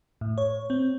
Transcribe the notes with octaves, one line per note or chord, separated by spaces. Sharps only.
A2
C#5
C4